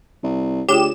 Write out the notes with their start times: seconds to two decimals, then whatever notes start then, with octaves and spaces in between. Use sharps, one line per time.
0.23 C2
0.69 D2 F4 G4 G#4 C#5 E7